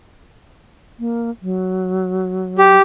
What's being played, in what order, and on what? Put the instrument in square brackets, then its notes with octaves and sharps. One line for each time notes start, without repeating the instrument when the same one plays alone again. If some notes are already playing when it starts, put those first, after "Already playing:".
[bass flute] A#3
F#3
[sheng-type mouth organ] G4